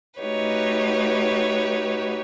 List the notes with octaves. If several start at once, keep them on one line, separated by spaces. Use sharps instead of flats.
A3 D#4 F#4 G4 B4 C#5